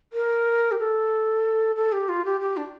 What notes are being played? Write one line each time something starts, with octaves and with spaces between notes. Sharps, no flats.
A#4
G4
A4
A4
G4
F4
G4
G4
D4